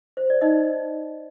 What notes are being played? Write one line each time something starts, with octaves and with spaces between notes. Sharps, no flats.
C5
D5
D#4 D#5